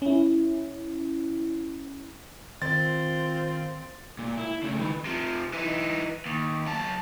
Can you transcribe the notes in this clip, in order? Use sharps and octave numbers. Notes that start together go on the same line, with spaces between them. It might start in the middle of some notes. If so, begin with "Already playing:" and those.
C#4 E4
D#3 C4 F4 A6
A#2
E4
C#3 A3
D#3 B4
C3 F3
E3 D#4
D#2
F#3 A5